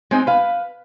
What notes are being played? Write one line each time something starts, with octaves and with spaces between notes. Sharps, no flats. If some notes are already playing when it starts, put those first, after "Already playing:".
G#3 C4 D#4
B4 F5